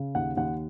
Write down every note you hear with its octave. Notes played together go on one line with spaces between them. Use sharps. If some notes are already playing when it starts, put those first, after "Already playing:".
Already playing: C#3
D#2 F#5
D#2 F#5